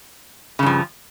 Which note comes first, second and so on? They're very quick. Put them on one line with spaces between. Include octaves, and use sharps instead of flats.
C#3 G2 F3